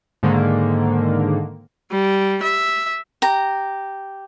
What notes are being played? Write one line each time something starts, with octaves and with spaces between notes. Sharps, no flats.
G#2 D3 D#3 A#3
G3
E5
G4 A#5